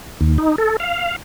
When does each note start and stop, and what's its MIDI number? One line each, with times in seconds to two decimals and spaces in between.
0.21 0.38 39
0.38 0.56 63
0.58 0.77 69
0.80 1.16 77